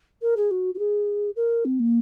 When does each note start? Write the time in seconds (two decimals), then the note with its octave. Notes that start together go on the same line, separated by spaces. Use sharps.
0.21 A#4
0.36 G#4
0.50 F#4
0.74 F#4
0.78 G#4
1.36 A#4
1.65 C4
1.79 A#3